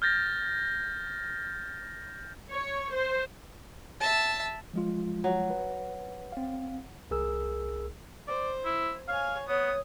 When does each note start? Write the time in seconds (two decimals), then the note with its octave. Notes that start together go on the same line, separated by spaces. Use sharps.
0.02 F6 G6 A6 A#6
2.49 C#5
2.92 C5
4.01 E5 A5
4.73 F3 G#3 F4
5.24 F#3
5.50 B4
6.32 C4 F5
7.11 C2 G#4 A#4 E6
8.28 C5 D5
8.65 E4
9.08 C#5 F5 G#5
9.48 B3 C#5 D#6